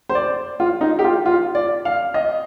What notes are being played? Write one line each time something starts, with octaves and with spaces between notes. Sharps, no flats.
C5
D5
F4
D#4
G4
F4
F4
D5
F5
D#5